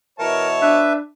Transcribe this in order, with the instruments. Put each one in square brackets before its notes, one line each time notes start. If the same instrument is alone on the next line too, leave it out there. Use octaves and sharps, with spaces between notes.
[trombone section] B2 E3 E4 [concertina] A#4 [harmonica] C#5 A5 C#6
[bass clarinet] D4 [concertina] B4 E5